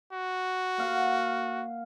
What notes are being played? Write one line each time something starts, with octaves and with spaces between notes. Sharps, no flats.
F#4
A#3 F5 F#5